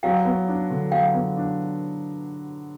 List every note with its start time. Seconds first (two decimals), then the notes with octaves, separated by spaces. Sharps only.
0.03 F#3 F5 G5
0.25 B3
0.48 D4
0.70 D3
0.91 F#3 F5 G5
1.14 B3
1.37 D4